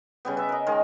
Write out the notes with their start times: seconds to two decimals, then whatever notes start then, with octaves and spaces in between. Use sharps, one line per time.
0.25 C#3 G3 B3
0.37 B4 E5
0.49 A#4 D#5
0.66 D#3 G#3 A#4